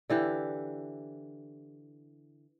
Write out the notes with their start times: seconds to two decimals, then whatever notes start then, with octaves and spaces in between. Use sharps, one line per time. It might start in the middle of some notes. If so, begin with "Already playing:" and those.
0.10 D3 E3 G4